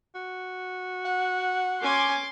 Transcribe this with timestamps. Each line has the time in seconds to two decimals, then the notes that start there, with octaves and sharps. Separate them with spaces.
0.15 F#4
1.05 F#5
1.82 C#4 G#5 C6 D6